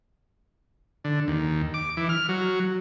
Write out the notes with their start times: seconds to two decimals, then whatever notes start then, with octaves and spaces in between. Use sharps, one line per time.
1.04 D3
1.28 D#2
1.74 D6
1.97 E3
2.09 F6
2.29 F#3